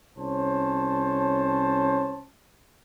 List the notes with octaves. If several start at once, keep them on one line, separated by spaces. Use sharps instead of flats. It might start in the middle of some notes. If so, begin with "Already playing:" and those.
C2 C#4 C5 C#5 A5